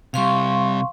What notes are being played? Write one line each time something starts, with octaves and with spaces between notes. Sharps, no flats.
C3 G3 F5 C6 C#6